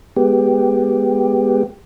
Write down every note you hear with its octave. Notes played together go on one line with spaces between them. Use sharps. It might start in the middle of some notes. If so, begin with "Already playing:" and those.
G#3 B3 G4